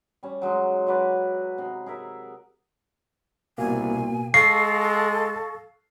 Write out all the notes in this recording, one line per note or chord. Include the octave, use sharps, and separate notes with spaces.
G3 C#4
F#3 G#3 D#4
F#3 B4 D5
C3 D#4
G#4 A#4 E5
C2 B2 A#3 G#5
G#3 A4 F5 C#6 A#6 C7